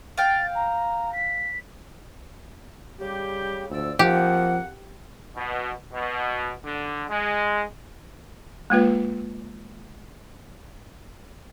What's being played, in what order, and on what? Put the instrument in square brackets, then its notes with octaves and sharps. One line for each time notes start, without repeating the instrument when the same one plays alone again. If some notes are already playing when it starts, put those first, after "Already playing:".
[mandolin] F5 G5 [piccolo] A6
[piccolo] A#5
B6
[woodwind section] C#3 G3 G4
[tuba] D2 [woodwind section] F3 D5 E6
[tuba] F3 [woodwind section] A#3 C4 F#5 [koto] G4
[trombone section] B2
B2
D3
G#3
[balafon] G#3 A#3 F4 B4